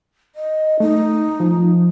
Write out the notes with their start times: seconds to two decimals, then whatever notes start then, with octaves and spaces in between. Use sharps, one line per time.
0.35 D#5
0.80 A3 D#4
1.40 F3